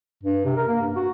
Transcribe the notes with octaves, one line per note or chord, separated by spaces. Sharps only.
G2
C3
A#4
A#3
G2
F#4